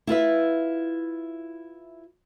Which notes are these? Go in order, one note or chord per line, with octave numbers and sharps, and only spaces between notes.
E4 F4 B4 E5